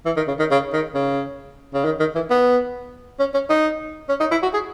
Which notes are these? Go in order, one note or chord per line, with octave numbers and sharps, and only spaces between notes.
E3
D#3
C#3
D#3
C#3
D#3
C#3
C#3
D#3
D#3
E3
B3
C#4
C#4
D#4
C#4
D#4
E4
F#4
G#4